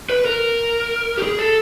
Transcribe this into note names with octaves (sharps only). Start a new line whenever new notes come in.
B4
A#4
G4
G#4
A4